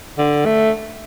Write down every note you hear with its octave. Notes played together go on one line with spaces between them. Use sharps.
D3
A3